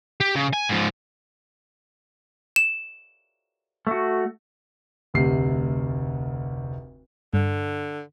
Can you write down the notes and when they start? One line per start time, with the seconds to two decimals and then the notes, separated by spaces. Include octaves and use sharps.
0.21 G4
0.35 C#3
0.53 G#5
0.69 G#2 F3
2.56 E7
3.87 A3 F#4
5.14 F1 D2 C3 C7
7.34 G2 D3